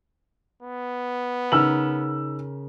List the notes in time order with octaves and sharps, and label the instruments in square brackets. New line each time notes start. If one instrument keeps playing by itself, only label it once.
[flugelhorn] B3
[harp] C#3 A#4 F6 [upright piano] D#4 E6 F#7